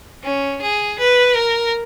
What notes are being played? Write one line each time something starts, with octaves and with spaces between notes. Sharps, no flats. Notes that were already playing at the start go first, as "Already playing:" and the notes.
C#4
G#4
B4
A#4